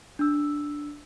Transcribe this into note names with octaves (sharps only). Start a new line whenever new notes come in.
D4 E6